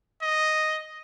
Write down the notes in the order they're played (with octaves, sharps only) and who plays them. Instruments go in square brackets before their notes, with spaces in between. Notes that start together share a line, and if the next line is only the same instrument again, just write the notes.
[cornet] D#5